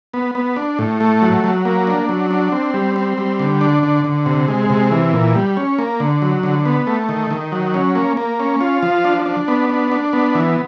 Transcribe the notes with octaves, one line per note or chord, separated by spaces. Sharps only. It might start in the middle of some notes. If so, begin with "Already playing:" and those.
B3
B3
D4
A2
A3
F#3
F#3
A#3
D4
F#3
D4
C4
G3
C4
G3
D3
D4
D3
D3
C3
G#3
C3
E3
A#2
G3
C#4
A#3
D3
F#3
D3
B3
A3
D#3
D#3
F#3
C#4
A#3
A#3
C#4
F4
F3
D4
D4
B3
D4
D4
B3
E3